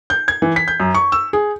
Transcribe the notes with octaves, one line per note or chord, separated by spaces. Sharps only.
G6
G#6
E3
B6
G6
F#2
C#6
E6
G#4